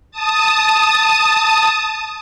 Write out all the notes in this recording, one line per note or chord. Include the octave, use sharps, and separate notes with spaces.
A5 D#6